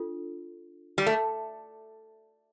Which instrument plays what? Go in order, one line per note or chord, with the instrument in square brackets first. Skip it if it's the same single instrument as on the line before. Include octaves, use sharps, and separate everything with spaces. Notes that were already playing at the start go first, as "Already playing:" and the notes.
Already playing: [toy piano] D4 F4 A4
[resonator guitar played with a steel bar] G3
A3